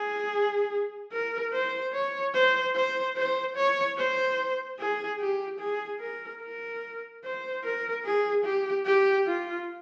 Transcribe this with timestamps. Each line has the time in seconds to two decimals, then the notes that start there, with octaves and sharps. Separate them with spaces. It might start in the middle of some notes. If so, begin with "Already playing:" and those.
Already playing: G#4
1.12 A#4
1.53 C5
1.94 C#5
2.34 C5
2.76 C5
3.16 C5
3.56 C#5
3.97 C5
4.79 G#4
5.20 G4
5.60 G#4
6.00 A#4
6.41 A#4
7.24 C5
7.64 A#4
8.05 G#4
8.45 G4
8.86 G4
9.27 F4